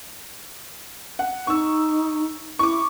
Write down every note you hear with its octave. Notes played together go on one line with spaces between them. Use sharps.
F#5
D#4 C#6 E6
E4 C#6 D6